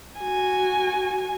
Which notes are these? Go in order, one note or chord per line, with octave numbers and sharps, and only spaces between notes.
F#4 G#5